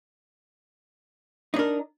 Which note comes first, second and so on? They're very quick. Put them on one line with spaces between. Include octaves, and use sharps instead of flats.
D#4 D4 A#4